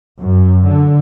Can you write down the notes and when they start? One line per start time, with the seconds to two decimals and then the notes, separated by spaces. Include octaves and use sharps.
0.20 F#2
0.65 D3